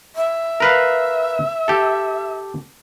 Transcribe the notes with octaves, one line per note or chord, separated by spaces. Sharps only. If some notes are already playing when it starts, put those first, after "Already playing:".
E5
A#4 B4 F5
G4 A4